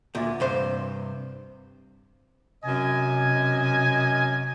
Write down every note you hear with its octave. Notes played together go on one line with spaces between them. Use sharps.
D2 A#2
G2 C3 C5
F#2 C3 D#5 G#5